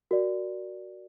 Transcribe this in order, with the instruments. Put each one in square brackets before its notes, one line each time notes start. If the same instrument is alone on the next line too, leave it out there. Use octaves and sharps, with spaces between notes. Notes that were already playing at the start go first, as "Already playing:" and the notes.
[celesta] F#4 A#4 D5